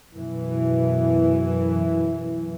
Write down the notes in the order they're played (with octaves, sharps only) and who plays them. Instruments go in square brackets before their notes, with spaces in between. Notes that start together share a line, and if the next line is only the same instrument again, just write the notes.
[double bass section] F#2 B2 E3